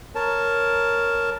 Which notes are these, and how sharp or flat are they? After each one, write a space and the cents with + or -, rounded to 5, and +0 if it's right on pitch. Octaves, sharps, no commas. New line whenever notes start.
A#4 +0 C#5 +0 A5 +0